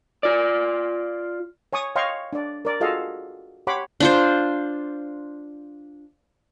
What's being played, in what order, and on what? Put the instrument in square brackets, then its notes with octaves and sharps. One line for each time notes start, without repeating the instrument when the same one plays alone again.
[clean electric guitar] F4 D5
[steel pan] C#5 G#5 C#6 D#6
C#5 D#5 F5 G5 C6 C#6
D4 D5
A#4 D5
F4 F#4 G#4 A4 D#5 F5
G4 C#5 F#5 B5 C6 D6
[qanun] D4 F4 C5